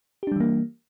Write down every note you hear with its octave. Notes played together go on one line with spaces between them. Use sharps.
E3 G3 A#3 D4 G4